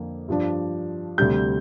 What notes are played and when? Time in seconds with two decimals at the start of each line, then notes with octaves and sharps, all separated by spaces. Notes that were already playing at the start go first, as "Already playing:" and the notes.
Already playing: F2 D3 A#3
0.28 G2 F3 D4
1.18 D2 C3 G3 G6